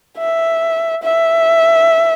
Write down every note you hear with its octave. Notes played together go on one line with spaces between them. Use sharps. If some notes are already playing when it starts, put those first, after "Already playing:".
E5
E5